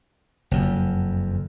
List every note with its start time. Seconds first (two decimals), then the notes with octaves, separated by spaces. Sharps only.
0.51 F#1 F2